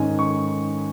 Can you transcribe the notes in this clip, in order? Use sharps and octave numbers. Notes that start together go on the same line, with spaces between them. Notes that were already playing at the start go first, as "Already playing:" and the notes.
Already playing: G#2 D#3 G#3 C#4 G#5
C#6